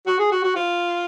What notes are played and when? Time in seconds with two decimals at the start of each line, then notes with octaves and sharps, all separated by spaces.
0.07 F#4
0.19 G#4
0.31 F#4
0.44 F#4
0.55 F4